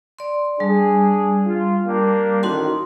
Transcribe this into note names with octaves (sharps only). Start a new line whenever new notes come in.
D5 C6
G3 D4 G#4
F4
A#3 D4 G4
A1 D#3 D#4 F#4 C6